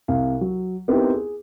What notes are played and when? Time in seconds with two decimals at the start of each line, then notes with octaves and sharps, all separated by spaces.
0.08 C2 F5
0.41 F#3
0.88 B3 C4 D#4 E4 G4 A#4
1.14 G#4